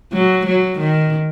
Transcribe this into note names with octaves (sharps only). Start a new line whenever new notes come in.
F#3
F#3
D#3